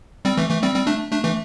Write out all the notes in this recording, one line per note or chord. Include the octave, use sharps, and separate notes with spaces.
G3 C4
E3 A3
E3 A3
G3 C4
G3 C4
A3 D4
A3 D4
E3 A3